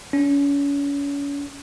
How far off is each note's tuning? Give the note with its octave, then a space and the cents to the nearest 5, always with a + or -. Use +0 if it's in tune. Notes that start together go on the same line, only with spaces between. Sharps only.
C#4 +35